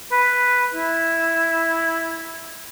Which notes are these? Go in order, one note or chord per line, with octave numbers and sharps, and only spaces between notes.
B4
E4